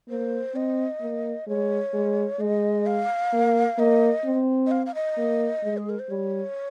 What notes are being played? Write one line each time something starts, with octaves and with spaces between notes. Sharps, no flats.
A#3 C5
C4 D#5
A#3
G#3 C#5
G#3
G#3 D#5
F5
A#3
A#3 D#5
C4
D#5
F5
F5
D#5
A#3
G#3
G#4
A#4
C5
G3 C#5